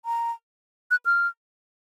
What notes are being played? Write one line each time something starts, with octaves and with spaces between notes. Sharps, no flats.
A#5
F#6
F6